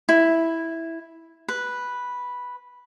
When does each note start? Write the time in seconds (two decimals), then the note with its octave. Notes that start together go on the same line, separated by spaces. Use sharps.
0.09 E4
1.48 B4